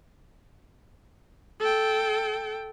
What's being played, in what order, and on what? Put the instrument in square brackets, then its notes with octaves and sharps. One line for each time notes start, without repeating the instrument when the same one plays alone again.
[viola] A4 G5